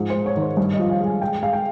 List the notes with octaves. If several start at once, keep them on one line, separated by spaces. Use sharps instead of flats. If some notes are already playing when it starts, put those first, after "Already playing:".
Already playing: G#2 F3
C5
G#3
C#5
D#3 C5
G2 C#5
D#5
F3
F5
G#3 G#5
G#3 G5
G#3 F5
G5